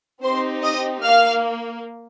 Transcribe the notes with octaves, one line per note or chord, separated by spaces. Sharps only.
C4 D#4 G4 C5 C6
D#5 D#6
A#3 F5 F6